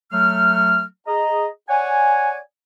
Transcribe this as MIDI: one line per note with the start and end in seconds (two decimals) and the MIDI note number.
0.12 0.84 54
0.12 0.84 57
0.12 0.84 89
1.08 1.47 68
1.08 1.47 75
1.08 1.47 82
1.69 2.37 73
1.69 2.37 74
1.69 2.37 78
1.69 2.37 80